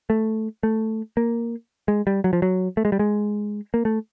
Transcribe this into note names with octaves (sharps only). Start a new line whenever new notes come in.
A3
A3
A#3
G#3
G3
F#3
F3
F#3
A3
G#3
G3
G#3
A#3
A3